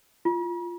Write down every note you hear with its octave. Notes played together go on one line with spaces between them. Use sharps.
F4